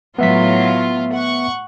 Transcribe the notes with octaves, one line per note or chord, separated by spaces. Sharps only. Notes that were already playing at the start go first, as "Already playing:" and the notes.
A2 F#3 B3 F4 E5 B6
F#5 C#6